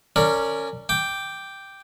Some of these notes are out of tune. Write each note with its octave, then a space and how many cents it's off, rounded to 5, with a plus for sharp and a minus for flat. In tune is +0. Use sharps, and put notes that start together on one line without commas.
C#4 +0 A#4 -30 D5 +0
G5 +0 D6 +0